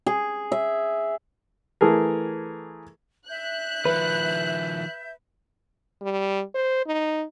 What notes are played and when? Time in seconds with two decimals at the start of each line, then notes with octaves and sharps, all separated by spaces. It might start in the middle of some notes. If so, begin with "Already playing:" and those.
0.06 G#4
0.52 E5
1.81 E3 A3 G#4 A#4
3.29 E5 F#6 G6
3.85 D#3 F3 B4
6.02 G3
6.54 C5
6.86 D#4